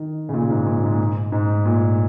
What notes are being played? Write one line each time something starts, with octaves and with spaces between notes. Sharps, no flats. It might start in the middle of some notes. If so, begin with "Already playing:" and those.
Already playing: D#3
C#3
A#2
G#2
A#2
G#2
G#2
A#2